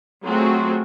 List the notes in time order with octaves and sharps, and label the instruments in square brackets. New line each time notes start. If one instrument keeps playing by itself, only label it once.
[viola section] F#3 A3 C4 F4 F#4 G#4